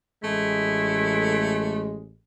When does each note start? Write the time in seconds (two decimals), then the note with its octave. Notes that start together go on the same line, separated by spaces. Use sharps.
0.24 A1 G#3 A3 E4